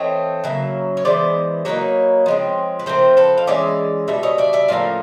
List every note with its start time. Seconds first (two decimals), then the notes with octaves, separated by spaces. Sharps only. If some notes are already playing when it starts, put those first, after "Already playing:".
Already playing: E3 A3 C4 C#5 D#5
0.44 C#3 F#3 A#3 E5
0.97 C#5
1.05 E3 G#3 B3 C5 D5
1.65 F#3 A#3 D#4 B4 C#5
2.26 F3 G#3 C4
2.79 B4
2.86 F3 A3 C4 A#4 C5
3.17 A4 B4
3.38 F5
3.47 E3 G#3 C#4 D5 E5
4.08 B2 G3 E5
4.23 C#5 D#5
4.38 D5 E5
4.53 D5 E5
4.68 A2 F3 A#3 C#4 F5